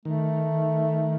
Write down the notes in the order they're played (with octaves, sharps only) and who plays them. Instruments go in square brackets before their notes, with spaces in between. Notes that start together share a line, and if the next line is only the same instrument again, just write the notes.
[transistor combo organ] D#3 [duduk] A3